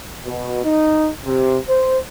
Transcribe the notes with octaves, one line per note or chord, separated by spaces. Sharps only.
B2
D#4
C3
C5